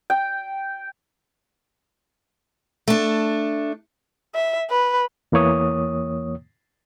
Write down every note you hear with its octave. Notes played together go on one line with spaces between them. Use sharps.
G5
A3 D4
E5
B4
E2 E3 A#3 C#5 D#6